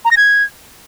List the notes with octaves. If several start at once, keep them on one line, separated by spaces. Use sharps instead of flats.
A#5
A#6
G#6